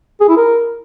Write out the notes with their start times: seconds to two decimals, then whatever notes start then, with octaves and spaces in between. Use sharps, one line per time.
0.21 G#4
0.29 E4
0.37 A#4